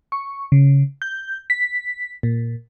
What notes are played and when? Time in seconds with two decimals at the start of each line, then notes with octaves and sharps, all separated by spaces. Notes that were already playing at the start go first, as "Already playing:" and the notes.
0.12 C#6
0.52 C#3
1.02 G6
1.50 B6
2.23 A#2